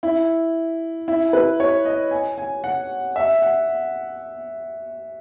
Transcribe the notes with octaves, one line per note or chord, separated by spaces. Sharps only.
E4
E4
B4
C#5
D#5
G#5
G#5
F#5
E5
F#5